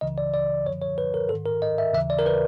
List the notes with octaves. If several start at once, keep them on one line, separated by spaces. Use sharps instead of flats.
C#2 C#3 E3 D#5
D5
D5
F#2 D3 F3 C#5
C#5
B4
A#4
G#2 D#3 A4
A#4
D#5
E5
D#2 C#3 E3 E5
D5
A#4
B4